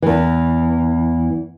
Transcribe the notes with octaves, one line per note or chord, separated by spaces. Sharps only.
E2 E3